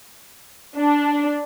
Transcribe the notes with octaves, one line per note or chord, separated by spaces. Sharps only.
D4